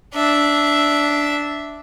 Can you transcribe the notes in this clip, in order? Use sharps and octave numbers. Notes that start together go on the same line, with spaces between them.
D4 E5